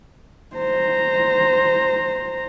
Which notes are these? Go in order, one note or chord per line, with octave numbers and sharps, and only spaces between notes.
C5 A#5